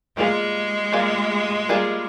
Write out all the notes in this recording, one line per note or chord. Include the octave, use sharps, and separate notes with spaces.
G3 G#3 A#3 F4 G#4
G3 A#3 F4 G#4
G3 A#3 F4 G#4